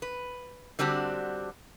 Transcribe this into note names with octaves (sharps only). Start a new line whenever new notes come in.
B4
D3 G3 C4 D4 F#4